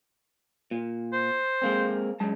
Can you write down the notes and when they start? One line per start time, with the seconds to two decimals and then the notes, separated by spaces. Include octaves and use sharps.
0.71 A#2
1.13 C5
1.62 G#3 A#3 C4
2.20 F#2 G#3 A5